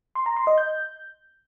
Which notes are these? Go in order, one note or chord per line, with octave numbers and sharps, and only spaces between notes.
C6
A#5
C6
D#5
G6